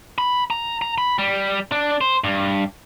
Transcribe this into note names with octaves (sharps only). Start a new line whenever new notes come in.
B5
A#5
A#5
B5
G3
D4
C5
G2